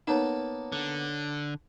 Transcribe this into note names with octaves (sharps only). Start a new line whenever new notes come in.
A#3 B3 D#4 C#5 A5 E7
D3